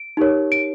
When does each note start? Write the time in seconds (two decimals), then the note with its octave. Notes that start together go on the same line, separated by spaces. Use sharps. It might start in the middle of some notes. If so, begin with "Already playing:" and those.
Already playing: D7
0.17 D#4 G4 A#4 C#5
0.52 D7